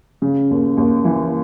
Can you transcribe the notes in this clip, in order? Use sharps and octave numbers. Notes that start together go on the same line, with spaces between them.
C#3
D#2
D#2
E3